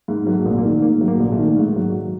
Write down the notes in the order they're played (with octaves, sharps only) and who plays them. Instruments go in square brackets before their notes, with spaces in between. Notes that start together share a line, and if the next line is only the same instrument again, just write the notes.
[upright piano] G#2 [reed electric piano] A#3
[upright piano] F#3 [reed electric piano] A#3
[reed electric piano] A3
[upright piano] A#1
[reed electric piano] A#3
[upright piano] D#3
[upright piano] G#2 [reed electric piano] A#3
[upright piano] F#3
[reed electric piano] A#3
[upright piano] A#1
[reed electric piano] A3
[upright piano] D#3
[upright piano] G#2 [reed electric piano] G#3
[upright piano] F#3